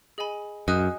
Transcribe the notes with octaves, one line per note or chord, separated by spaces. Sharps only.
G#4 D#5 G#5 B5
F#2 D#5 G#5 D#6 F#6